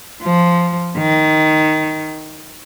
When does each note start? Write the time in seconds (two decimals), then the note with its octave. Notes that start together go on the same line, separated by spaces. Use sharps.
0.23 F3
0.97 D#3